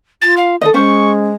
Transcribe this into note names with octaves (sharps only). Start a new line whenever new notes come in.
F4 A6
F5
D#3 A4 D#5 D#6
G#3 C#4 C5 C#6